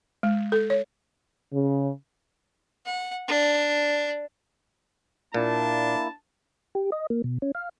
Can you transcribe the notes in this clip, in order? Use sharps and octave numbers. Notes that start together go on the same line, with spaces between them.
G#3
A4
C#5
C#3
F#5
D4
A#2 A#3 D4 E4 A5
G4
D#5
A#3
B2
C#4
F5